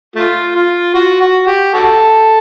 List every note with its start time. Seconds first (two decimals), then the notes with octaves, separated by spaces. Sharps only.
0.16 A3 F4
0.55 F4
0.94 F#4
1.21 F#4
1.47 G4
1.74 F#4 A4